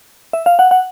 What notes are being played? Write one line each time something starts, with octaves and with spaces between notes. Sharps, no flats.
E5
F5
F#5
F#5